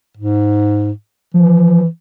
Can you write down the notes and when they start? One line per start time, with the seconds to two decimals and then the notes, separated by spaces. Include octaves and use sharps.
0.17 G#2
1.34 E3 F3